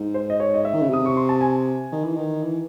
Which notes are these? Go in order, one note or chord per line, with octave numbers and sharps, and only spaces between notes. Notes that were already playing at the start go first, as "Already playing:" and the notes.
Already playing: G#2
C5
D#5
C#5
D#5
E5
D#3
C#3
C3 D#6
C#6
C6
A5
G#5
D#3
E3
D#3
E3